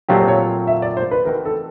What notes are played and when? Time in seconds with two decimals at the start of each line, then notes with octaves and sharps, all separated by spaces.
0.09 A#2 F#3 A3 C4 F4 G4
0.20 C5
0.28 C#5
0.67 E5
0.82 D5
0.97 C5
1.11 B4
1.25 E3 A3 C4 D#4 F#4 A#4
1.45 A4